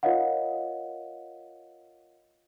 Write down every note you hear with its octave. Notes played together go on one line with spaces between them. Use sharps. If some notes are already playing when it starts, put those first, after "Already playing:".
F4 A#4 C#5 D#5 F5 F#5